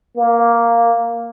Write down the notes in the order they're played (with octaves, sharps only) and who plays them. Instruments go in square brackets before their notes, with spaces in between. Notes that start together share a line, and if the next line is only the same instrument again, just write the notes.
[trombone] A#3